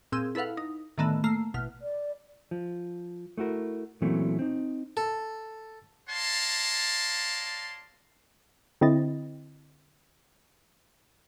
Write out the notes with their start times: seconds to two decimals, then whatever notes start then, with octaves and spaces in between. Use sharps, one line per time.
0.12 A#2 C4 G#4 E6
0.35 E4 A4 B4 F5 F#5
0.57 D#4
0.98 A2 D3 D#3 A3 B3
1.24 A3 A#3 A#5 C7
1.54 A1 B2 F6
1.82 D5
2.51 F3
3.37 A3 E4 F#4 A#4
4.02 A#2 E3 F#3 A3 C4 C#4
4.39 C4 D#4
4.97 A4
6.09 C#5 D5 F5 A5 A#5 C6
8.81 D3 C4 E4 D#5 A6